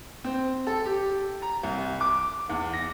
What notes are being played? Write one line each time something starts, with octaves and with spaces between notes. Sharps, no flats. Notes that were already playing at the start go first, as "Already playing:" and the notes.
C4
A4
G4
A#5
C2
D6
E2
A#6